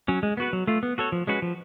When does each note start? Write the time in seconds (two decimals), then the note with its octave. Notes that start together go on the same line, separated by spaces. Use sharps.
0.08 F#3 C#4
0.23 G#3
0.37 B3 F#4 B4
0.53 F#3
0.67 A3 F4
0.83 B3
0.98 F#4 A4 C#5
1.12 F3
1.27 G#3 C#4 F#4 B4
1.42 F3